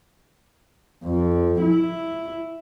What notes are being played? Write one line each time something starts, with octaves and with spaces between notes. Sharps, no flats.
F2
E4